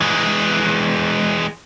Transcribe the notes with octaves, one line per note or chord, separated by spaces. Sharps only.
E3 G#3